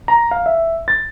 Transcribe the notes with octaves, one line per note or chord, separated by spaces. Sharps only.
A#5
F5
E5
A6